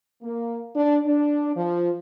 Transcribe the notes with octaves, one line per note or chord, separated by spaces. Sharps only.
A#3
D4
D4
F3